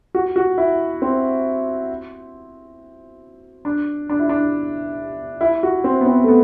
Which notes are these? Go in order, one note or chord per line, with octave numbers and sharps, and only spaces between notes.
F#4
F#4
E4
C4
D4
D4
E4
D4
E4
F#4
C4
B3
C4
A3
B3